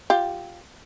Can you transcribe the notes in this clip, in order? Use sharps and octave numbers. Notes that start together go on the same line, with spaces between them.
F4 G4